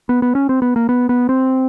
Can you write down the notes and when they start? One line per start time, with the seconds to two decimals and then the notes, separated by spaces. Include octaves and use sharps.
0.09 B3
0.22 B3
0.35 C#4
0.49 C4
0.62 B3
0.76 A#3
0.89 B3
1.09 B3
1.29 C4